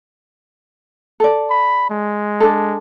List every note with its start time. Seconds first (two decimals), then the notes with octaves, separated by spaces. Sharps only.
1.20 A4 D5
1.50 B5
1.90 G#3
2.40 D4 A4